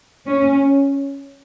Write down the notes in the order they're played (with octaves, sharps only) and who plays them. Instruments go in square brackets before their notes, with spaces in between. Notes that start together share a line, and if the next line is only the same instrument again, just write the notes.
[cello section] C#4